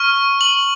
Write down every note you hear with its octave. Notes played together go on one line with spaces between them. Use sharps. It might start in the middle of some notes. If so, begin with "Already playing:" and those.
Already playing: C#6 F6
F#7